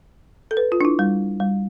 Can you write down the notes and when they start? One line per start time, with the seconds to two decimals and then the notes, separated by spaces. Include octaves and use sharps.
0.51 A4
0.57 B4
0.72 F4
0.81 D4
0.85 E4
0.99 G3
1.40 G3